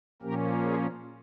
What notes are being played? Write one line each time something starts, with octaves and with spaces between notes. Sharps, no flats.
A#2 F3 A#3 C#4 G4 A#4
F4 G#4